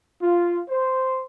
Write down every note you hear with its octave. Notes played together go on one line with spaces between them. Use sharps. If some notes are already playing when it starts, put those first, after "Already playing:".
F4
C5